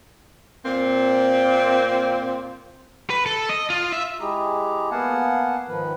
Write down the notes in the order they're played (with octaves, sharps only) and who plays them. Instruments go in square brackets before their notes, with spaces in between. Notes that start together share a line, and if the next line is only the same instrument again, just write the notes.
[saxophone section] A#2 A#3 C4
[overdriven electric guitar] B4
A4
D#5
F4
E5
[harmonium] G#3 E4 G4 G#4 A#5
A#3 B3 F5 F#5 G#5 A5
G#2 D#3 F3 B4